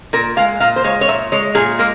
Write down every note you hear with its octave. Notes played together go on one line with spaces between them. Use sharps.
A#2 A#4
G#3 F5
A#2 F5
C5
G#3 C#5
C#5
A#2 E5
G#3 C#5
A#2 G#4
G#3 A#3